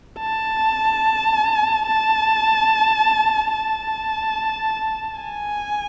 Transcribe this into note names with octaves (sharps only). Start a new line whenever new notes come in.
A5
A5
A5
G#5